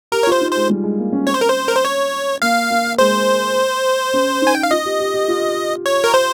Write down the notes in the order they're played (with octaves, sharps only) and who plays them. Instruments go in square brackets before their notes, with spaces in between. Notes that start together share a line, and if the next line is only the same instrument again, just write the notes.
[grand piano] G4 [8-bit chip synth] A#4
[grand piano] F4 [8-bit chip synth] C#5
[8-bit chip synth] C5
[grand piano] D#4
[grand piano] G#3 [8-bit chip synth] C5
[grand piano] G3
G#3
A#3
C#4
[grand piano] C4 [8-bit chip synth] C#5
[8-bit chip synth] C5
A#4
C5
A#4
C5
C#5
[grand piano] A#3 [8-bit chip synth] F5
[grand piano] A#3
[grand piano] G#3 [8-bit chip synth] C5
[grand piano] C#4
D#4
[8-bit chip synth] G#5
G5
F5
[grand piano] F4 [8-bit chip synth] D#5
[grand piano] G4
G4
G4
F4
[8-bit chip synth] C#5
A#4
C5